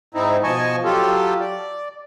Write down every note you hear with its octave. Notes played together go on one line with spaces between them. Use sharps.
G#2 C4 D#4 E4
B2 F3 D#5 G#5 A5 C#6
F#3 F4 G4 A4
D5